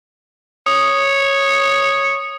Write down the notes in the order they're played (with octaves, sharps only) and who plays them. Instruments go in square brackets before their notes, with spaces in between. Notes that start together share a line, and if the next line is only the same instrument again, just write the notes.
[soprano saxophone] C#5 [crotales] D#6